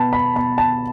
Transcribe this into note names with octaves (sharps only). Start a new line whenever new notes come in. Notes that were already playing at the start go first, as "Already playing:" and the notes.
Already playing: B2 B3 A5 B5
B5
B2 B5
A5